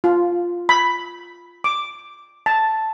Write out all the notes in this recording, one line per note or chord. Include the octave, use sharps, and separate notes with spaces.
F4
B5
D6
A5